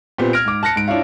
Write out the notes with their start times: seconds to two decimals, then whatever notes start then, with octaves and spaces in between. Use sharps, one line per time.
0.18 A#2 B3 C4 G4
0.33 F6 G#6 A#6 D7
0.45 G#2 D6
0.63 A5 F#6 A#6 C#7
0.76 G#2 D7
0.88 D4 E4 F4 C#5 F5